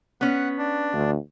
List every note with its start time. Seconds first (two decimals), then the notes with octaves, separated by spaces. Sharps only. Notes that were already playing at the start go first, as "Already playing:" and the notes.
0.21 B3 C#4 F#5
0.58 D4
0.94 D2